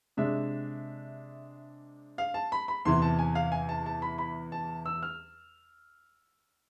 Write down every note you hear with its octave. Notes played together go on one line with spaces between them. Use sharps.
C3 G#3 D4 E5
F5
A5
B5
B5
E2 C3 E3 C6
A5
G#5
F5
G#5
A5
A5
B5
B5
A5
E6
F6